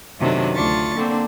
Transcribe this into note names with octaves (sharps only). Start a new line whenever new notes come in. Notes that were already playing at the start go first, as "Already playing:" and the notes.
F#2 C3 D#3 F#3 A3 D4
D2 D4 F4 C#6 A6
D3 A#3 C4 D4